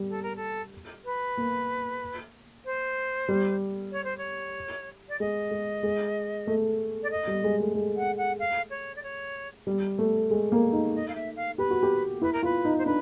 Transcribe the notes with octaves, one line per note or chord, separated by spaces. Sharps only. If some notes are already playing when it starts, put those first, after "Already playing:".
Already playing: G3
A4
A#4
A4
B4
A#3
C5
G3
C#5
C5
C#5
D5
G#3 D#5
G#3
G#3
A3
D5
D#5
G3
G#3
A3
G#3
F#5
F#5
F5
C#5
D5
C#5
G3
A3
G#3
A#3
D#4
D#5
F5
E5
F5
G4 B4
F#4
G4
E4 B4
A#4
F4 B4
D#4
C5
D4 B4